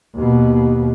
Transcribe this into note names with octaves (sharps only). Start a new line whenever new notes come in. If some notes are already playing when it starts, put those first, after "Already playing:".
D#2 B2